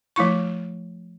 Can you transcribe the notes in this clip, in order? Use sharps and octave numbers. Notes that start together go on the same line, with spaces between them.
F3 A3 E4 C#6